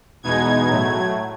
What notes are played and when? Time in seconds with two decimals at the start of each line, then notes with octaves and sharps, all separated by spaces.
0.23 E2 B2 G#3 B3 D#4 G#6
0.68 A2 F#3 A3